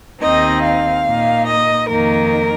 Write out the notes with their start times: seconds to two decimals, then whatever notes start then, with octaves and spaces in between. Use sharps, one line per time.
0.21 D#2 D#3 C4 D#4 D#5
0.63 F5
1.05 A#2 A#3 D#4
1.48 D#5
1.89 F2 D#3 A#3 D#4 A#4